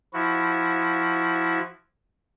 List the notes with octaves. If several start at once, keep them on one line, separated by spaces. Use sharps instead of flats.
F3 E4 F#4